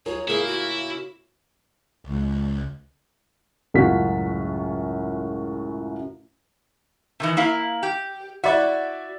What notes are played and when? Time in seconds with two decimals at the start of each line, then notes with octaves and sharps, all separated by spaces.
0.06 F#3 F4 G#4 A#4 C#5
0.28 A2 C#3 A#3 E4 G#4
0.46 F#4
2.06 C#2
3.74 C#2 F#2 A2 F4 F#4 B6
7.20 C3 D#3 E3
7.37 A#3 E4 F5
7.83 G4
8.44 E4 F#4 D5 E5